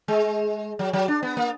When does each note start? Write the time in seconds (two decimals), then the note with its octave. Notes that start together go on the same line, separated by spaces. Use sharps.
0.08 G#3
0.79 F#3
0.93 F#3
1.08 D4
1.23 B3
1.37 A#3